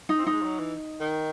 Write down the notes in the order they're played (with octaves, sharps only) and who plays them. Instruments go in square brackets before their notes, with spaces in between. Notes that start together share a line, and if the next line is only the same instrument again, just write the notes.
[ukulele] D#4
[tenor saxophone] C4
[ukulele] D#4
[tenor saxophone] G#3
F3
F#3
E3
D#3